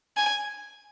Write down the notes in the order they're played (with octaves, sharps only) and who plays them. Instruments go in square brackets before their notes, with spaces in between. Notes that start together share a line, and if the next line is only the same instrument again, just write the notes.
[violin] G#5